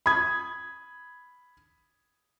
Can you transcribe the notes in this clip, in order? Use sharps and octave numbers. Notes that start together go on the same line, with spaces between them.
B5 D#6 G#6